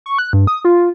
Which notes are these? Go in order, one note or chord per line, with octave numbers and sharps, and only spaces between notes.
C#6
F#6
G2
D#6
F4